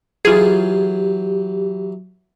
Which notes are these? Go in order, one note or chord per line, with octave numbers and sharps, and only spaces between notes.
E3 F#3 F4 G4 G#4